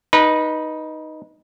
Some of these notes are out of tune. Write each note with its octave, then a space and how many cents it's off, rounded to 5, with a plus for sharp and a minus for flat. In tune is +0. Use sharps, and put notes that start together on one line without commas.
D#4 +0 B4 -20